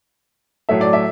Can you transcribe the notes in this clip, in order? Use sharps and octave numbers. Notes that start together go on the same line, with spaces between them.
A2 F#3 A3 E5
D5
E5